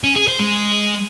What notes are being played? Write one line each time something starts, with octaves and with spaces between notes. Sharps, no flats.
C#4
G#4
C5
G#3